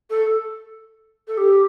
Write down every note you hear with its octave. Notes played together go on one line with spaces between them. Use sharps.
A4
A4
G4